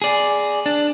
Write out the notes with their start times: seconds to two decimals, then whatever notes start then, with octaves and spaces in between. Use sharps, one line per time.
0.02 G#4 D5
0.66 D4